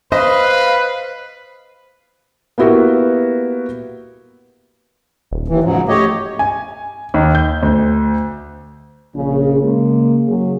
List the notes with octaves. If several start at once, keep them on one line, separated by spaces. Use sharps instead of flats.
B4 C5 D#5 F5
A#3 B3 E4 F#4 G4 B4
D#1
D#2 E3
G#2 C#3 F3 F#3
F3
A3 G4 C#5 D#5
G#5
D#2
G6
D2
A#1 C#3
C#3 G#3 A#3
F#1 F#3 G#4